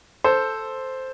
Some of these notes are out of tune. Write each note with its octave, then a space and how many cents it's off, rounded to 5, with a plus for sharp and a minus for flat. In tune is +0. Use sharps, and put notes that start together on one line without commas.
A4 +0 C5 +0